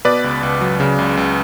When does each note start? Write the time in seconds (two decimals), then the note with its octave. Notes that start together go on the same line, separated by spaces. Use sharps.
0.05 B2 B4 D5
0.24 C#2
0.43 C#2
0.61 F#3
0.80 C#3
0.99 C#2
1.17 C#2